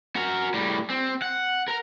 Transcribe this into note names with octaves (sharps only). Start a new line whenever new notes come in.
F#4 A#4
A2 G3
C4
F#5
A#4 A#5